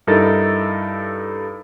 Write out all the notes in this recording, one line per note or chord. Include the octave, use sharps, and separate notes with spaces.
G2 D#4 E4 A4 A#4 A6